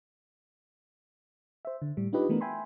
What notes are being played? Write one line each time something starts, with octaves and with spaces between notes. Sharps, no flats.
C5 E5
D3
A2 G3
D4 D#4 F4 G4 B4 D#5
E3 A3 B3 D4 A#4
E5 G5 G#5 B5 C6